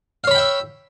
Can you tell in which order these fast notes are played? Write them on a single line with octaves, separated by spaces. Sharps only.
F5 C#5 B5 G5 E5